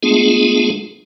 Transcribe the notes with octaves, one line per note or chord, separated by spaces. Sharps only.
G#3 A3 B3 D4 F4 G#4